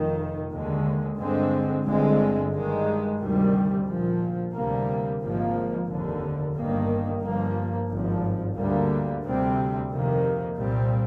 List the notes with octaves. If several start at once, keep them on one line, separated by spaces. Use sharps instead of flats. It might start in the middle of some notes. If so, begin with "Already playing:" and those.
Already playing: F1 F2 D#3
D#2 D3 G#3
G2 D3 G#3 C4
G1 G2 D3 G#3 C4
G2 D#3 G#3
D2 C3 D#3 G3
A#1 A#2 F3
D2 C3 G3 A#3
G#1 G#2 F3 A#3
F1 D#2 D3
G1 G2 D#3 A#3
G1 G2 F3 A#3
G#1 G2 F3
D2 D3 G3 A#3
D2 C3 G3 C4
F2 C3 D#3 A#3
C2 A#2 G3 C4